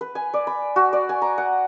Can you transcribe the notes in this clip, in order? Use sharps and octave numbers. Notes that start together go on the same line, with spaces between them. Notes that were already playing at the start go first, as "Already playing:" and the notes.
B4
G#5
D5
B5
F#4
D5
G#5
A#5
F#5